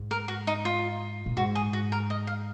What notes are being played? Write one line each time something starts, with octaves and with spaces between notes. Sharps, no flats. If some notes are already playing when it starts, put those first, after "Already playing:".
Already playing: G#2
A#4
F#4
D#4
F4
A#2
G#2 F#4
G#4
F#4
A#4
D#5
F5